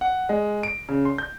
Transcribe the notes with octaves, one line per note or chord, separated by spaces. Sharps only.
F#5
G#3
D7
C#3
C6
G6